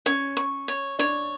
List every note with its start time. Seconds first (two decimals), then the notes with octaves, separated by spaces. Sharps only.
0.06 C#4 C#5
0.37 C#6
0.68 C#5
0.99 D4 C#5